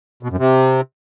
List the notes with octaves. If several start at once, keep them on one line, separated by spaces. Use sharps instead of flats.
B2
F#2
C3